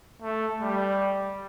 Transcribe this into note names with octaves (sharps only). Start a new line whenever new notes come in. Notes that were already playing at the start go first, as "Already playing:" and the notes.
A3
G3